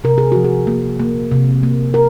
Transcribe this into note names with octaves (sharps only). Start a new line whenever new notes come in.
C3 A#4
G#4
F3 F#4
G#4
A#3
A#3
C3
A#3
A#4